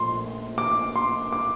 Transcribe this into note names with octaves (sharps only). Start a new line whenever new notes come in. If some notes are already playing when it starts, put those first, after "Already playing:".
Already playing: A#1 A#2 A3 C6
D6
C6
D6